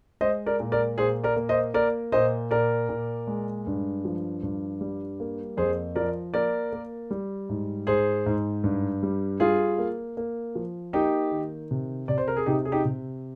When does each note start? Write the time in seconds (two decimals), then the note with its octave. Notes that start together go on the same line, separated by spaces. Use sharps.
0.21 G#3 C5 D#5
0.46 A#4 D5
0.60 A#2
0.72 A#4 D5
0.98 A#2 G#4 C5
1.24 A#4 D5
1.36 A#3
1.49 C5 D#5
1.74 A#3 A#4 D5
2.12 A#2 C5 D#5
2.51 A#2 A#4 D5
2.89 A#2
3.27 G#3
3.67 G2
4.05 F3
4.43 G2
4.81 G3
5.20 A#3
5.57 F2 G#4 C5
5.95 F3 A#4 D5
6.34 A#3 A#4 D5
6.72 A#3
7.11 G3
7.49 G#2
7.87 G#2 G#4 C5
8.26 G#2
8.64 G2
9.03 G3
9.40 G3 F4 G#4
9.78 A#3
10.17 A#3
10.55 F3
10.93 A#3 D#4 G4
11.32 D#3
11.71 C3
12.08 C3 D5
12.18 C5
12.28 A#4
12.37 G#4
12.46 C3 D#4 G4
12.65 G#4
12.72 D#4 G4
12.85 C3